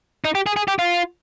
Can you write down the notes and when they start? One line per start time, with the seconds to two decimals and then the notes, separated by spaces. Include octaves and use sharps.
0.25 D#4
0.35 G4
0.46 G#4
0.56 G#4
0.68 G4
0.79 F4